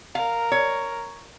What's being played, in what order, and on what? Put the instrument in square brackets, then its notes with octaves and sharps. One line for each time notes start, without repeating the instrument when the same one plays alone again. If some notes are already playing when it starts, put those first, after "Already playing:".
[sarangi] A#4 [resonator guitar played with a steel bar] F5
[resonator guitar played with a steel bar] C#5